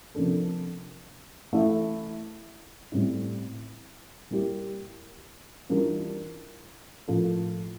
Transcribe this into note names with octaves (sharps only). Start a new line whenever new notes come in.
C3 F3 A#3 D4 A4
E3 A3 E4
A2 G3 C4 E4
G3 A#3 E4 G4
E3 G3 D4 F4 A#4
A2 F3 A#3 F4 A4